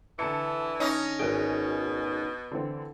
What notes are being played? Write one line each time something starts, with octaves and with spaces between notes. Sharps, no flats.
D3 E3 A5 C#7
C#4 D#4
G#1 B2 G#4 G5
D3 E3 C4